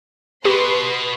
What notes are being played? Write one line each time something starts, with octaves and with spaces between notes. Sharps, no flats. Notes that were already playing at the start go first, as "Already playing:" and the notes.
B2 G4 B4 C6